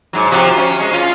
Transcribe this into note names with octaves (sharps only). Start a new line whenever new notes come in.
G#2 F#3
C3 F3 F#4
C#4
G#3
C#4 F4